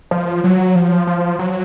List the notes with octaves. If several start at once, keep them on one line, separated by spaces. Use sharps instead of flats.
F3
F#3
F3
F3
F#3